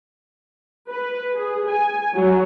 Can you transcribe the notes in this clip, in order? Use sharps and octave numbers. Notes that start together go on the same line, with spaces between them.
B4
G#4
G#5
F#3